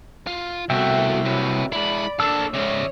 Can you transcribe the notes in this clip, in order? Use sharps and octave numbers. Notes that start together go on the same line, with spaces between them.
F4
C2 B2 A3 F#4 E5 G5
C3 F#3 B4
G#3 E4 D5 B5
A#3 D4 A4 E6
G#2 C#3 C#5 D5 E5